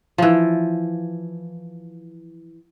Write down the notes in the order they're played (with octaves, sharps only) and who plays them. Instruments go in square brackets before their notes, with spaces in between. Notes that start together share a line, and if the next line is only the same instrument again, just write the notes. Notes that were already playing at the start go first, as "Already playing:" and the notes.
[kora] E3 F3